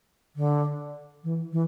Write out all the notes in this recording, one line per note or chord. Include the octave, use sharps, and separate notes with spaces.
D3
E3
E3